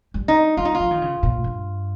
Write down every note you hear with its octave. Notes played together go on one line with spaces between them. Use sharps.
G3
D#4
G3 F4
D#4
F4
F3
D#3
C#3
A#2
G2